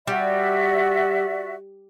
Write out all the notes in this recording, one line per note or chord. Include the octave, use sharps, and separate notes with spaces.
G3 F#4 D5 E5